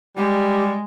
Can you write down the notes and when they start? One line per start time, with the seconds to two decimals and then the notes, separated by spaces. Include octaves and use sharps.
0.17 G3 G#3 G4